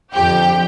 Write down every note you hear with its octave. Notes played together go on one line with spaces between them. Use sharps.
F2 D3 F3 G4 G5